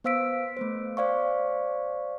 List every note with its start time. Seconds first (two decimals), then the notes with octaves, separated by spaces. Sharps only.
0.04 B3 C5 F5 E6 B6 D7
0.57 A3 B3 C5
0.97 C5 D5 F5 C#6